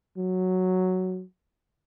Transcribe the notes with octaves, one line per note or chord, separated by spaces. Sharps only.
F#3